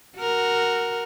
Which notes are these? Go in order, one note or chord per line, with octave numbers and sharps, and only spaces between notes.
F#4 A#4